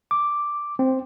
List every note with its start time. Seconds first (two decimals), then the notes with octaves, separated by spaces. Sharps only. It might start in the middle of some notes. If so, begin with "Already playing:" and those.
0.11 D6
0.79 C4